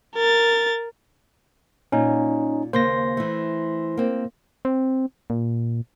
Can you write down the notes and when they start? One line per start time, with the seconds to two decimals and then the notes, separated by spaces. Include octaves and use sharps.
0.16 A#4 A6
1.92 A#2 C#4 D#4
2.73 D#2 C#3 A#3 C5 C6 A#6
3.17 E3 A3
3.97 A#3 C4
4.65 C4
5.30 A#2